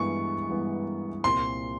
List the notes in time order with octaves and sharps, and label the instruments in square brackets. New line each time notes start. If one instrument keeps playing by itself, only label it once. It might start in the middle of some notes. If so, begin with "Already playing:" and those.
Already playing: [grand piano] G2 E3 G#3 B3 [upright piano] C#6
[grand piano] G2 E3 G#3 B3
[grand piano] C2 A#2 G3 C4 F4 [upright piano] C6